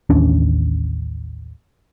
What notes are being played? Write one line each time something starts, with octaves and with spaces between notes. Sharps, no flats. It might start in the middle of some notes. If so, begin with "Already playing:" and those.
A1 D#2 C#4 D4